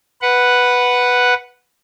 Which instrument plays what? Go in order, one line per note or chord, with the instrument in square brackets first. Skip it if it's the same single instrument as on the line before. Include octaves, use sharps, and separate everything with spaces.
[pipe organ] B4 F#5